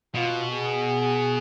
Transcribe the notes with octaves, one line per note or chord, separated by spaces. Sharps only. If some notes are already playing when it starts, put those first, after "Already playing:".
B2 F4
G#4